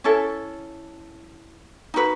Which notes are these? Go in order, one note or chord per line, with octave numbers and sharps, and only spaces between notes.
C#4 E4 A4
D#4 F#4 B4